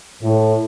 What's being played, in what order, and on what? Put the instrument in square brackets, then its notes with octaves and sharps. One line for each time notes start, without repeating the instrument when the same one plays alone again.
[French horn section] A2